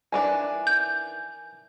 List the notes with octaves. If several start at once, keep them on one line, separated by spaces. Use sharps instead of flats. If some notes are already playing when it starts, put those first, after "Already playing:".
D#3 E3 D4 G#5
G6